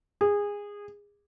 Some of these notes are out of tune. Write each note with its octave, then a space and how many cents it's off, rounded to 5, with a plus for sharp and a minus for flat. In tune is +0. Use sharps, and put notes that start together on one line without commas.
G#4 -20